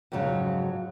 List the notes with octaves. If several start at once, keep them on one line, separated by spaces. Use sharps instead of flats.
F2 G#2 C#3 F#3